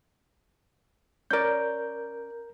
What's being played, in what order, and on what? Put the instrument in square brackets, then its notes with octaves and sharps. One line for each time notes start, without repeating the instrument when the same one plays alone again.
[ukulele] C#4 D5 [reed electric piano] A#4 G6